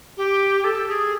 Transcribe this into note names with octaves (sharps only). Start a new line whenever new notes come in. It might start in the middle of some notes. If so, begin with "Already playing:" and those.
G4
A4
G#4